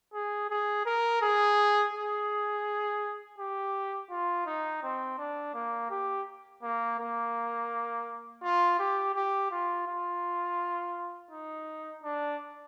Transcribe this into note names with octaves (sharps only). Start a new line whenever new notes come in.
G#4
G#4
A#4
G#4
G#4
G4
F4
D#4
C4
D4
A#3
G4
A#3
A#3
F4
G4
G4
F4
F4
D#4
D4